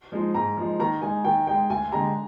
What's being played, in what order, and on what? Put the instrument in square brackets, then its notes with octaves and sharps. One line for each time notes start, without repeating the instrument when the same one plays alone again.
[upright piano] F3 G#3 D#4
[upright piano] G#2 [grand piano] A#5
[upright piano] F3 G#3 D#4
[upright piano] D#3 [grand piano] A#5
[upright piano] G#3 D#4 [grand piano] G#5
[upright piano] D#3 [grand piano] G5
[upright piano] G#3 D#4 [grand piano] G5
[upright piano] D2 [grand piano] G#5
[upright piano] D3 G#3 D4 G4 [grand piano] A#5